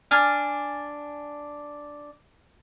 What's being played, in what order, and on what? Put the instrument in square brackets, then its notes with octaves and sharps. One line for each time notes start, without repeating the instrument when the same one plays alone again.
[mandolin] D4 G#5 F6